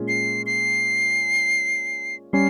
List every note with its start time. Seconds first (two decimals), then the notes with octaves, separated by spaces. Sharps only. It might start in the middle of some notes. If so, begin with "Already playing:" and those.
Already playing: A#2 G#3 C#4 F4 G#4
0.08 C7
0.46 C7
2.33 G3 C#4 C7